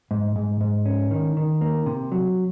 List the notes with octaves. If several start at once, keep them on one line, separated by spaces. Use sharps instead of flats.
G#2
G#2
G#2
C#4
D#3
D#3
A#3
C3
F#3